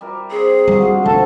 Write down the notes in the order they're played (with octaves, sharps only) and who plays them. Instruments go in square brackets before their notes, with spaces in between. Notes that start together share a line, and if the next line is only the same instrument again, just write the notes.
[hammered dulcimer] G3 A#4 E5
[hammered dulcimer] C4 [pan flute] G#4
[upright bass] G3 [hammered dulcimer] A#3 F4 F#4
[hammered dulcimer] D3
[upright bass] F1 [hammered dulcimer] F3 F#3 [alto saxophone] A4